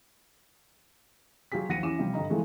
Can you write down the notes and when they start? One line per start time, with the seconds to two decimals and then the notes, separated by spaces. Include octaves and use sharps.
1.52 F#3 F4 G4 G#4 B6
1.69 D#2 F3 F#5 A#6 C#7 D#7
1.83 E3 C#4 D6 E7
1.99 C3 F3 G3
2.14 G2 D3 D#5 A#5
2.29 E3 F3 G#3 A3 C4